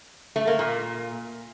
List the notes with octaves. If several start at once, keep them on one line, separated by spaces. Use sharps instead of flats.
A3
A#3
A#2